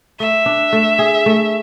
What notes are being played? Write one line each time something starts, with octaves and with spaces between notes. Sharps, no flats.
A3 E5
D4
A3
G#4
A3